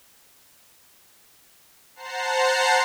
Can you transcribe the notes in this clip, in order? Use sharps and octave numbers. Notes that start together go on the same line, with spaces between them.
C5 F#5 A5 A#5 C7